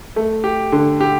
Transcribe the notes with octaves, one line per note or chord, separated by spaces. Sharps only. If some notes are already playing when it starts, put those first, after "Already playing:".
A3
G4
D3
G4